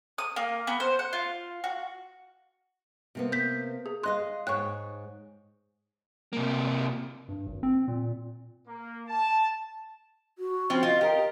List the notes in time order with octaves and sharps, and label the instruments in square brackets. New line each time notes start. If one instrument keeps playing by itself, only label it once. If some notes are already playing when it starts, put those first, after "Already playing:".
[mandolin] D#6
A#3
B3
C5
F#5
F4
F#4
[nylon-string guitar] C3 A#3 B3
[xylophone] G6 B6
G#4
[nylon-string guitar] G#4 D#5 F5 [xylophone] C6 F#6
[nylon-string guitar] G#2 C#5 G5 [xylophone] C#6 F#6
[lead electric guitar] C3 A#3
[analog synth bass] G2
G#1
C4
A#2
[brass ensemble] A#3
A5
[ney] F#4
[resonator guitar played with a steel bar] F3 C4 C#4
[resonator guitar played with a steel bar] F4 [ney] D#5
[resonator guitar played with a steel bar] G4 A#4